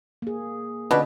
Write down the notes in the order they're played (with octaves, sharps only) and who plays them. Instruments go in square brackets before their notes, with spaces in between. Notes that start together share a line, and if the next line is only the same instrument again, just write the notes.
[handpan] A#3 G#4
[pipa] B2 D4 B4 [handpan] D3 C#4 F4